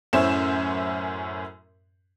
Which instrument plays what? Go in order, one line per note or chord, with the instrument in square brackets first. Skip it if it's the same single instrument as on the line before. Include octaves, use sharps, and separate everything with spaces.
[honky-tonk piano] F#2 A2 C#4 C5 E5 E7